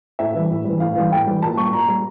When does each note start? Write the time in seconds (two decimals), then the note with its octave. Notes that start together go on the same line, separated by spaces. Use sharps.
0.19 A2 E5
0.35 E3 G3
0.51 A2
0.65 E3 G3
0.80 A2 F5
0.96 E3 G3
1.11 A2 G5
1.27 E3 G3
1.42 A#2 A5
1.57 G3 C#6
1.73 A#2 A#5
1.88 G3